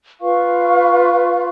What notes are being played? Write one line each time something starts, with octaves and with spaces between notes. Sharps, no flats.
F4 B4 F5 C#6